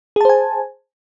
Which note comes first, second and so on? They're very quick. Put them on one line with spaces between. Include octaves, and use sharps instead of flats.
G#4 A5 C5 G#5